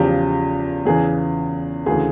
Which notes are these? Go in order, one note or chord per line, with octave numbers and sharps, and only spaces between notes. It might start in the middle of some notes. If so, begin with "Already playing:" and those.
Already playing: E2 C#3 F3 G4
E2 C#3 E3 G#4
D2 C#3 E3 G#4